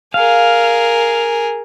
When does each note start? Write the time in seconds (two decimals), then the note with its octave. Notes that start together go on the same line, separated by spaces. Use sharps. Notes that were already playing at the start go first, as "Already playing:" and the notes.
0.14 G#4 A#4 F5